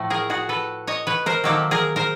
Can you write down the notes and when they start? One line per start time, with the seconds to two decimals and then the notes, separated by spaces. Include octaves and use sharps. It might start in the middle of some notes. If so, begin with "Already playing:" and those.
Already playing: A2 F3 A3
0.10 G#4 A#4
0.30 F#4 G#4
0.49 A4 B4
0.87 C#5 D#5
1.07 B4 C#5
1.26 A#4 C5
1.44 D#3 F#3 A#3 G4 A4
1.71 G#4 A#4
1.96 A#4 C5